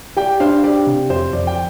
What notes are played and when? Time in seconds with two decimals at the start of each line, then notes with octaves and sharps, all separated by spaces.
0.17 G4 D5 G5
0.40 D4 C5 F5
0.64 G4 D5
0.87 C3
1.10 F2 C5
1.33 F2 D5
1.47 G5